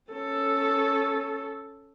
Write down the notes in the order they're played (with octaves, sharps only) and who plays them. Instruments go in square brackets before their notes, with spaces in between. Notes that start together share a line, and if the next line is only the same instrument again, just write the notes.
[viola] C#4 A4